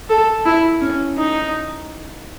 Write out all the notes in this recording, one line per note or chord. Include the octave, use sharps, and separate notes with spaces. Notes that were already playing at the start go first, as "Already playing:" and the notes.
A4
E4
C#4
D#4